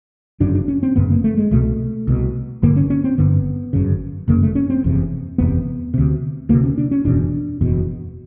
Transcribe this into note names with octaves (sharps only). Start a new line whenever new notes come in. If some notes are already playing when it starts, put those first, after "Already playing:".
G1 F#2 C#3 D4
D4
C#4
C4
G1 F#2 C#3 B3
A#3
A3
G#3
C2 B2 A3
C2 B2
G1 G2 D3 A#3
C#4
C#4
C4
G1 G2 D3 B3
G1 F#2 C#3
G1 F#2 C#3 A#3
A3
C#4
C4
F#1 E2 C3
F#1 E2 C3 B3
D2 C3
D2 C3 A#3
C#4
D4
C#4
F#1 E2 B2 D4
F#1 E2 B2